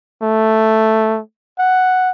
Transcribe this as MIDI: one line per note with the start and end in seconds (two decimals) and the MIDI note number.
0.22 1.20 57
1.59 2.10 78